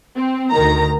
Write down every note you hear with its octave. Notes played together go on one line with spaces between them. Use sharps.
C4
D2 D#3 A#5